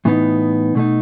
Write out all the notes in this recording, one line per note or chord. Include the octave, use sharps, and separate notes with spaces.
A2 E3 B3 D#4
B2 A3 D#4